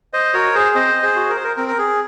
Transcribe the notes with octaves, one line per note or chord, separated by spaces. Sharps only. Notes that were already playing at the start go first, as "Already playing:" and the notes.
C5 D#5
F#4 A#4 C#5
G#4 C5
C4 C5 D#5
G#4 C5
F#4
A#4
C5
A#4
C4 A#4
A#4
G#4